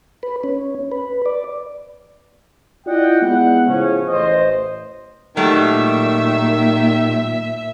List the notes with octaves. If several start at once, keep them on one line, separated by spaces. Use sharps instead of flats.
B4
C#4
B4
D5
E4 F4 D5 D#5 F#5 G5
G#3 B3 E4 F#5
A2 C#3 F3 C#4
A1 C5 D#5
A#2 D#3 F#3 G3 A3 E5